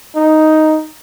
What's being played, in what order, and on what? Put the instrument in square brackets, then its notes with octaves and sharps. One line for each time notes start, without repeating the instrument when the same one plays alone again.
[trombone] D#4